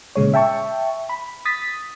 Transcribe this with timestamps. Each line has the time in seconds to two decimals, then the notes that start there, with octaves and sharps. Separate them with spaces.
0.16 A#2 C#3 G#3 C#5
0.34 E5 G5 A5 C#6
1.09 B5
1.45 D#6 A6 B6